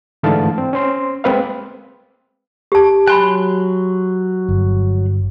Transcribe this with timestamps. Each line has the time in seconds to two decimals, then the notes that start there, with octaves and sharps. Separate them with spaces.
0.23 G#2 D3 E3 A3 F5 A5
0.58 C4
0.73 C#4 C5 C6
1.24 G#3 A#3 C4 B4 F5
2.72 G4 A5
3.07 F#3 G#5 B5 C6 F#6
4.49 G1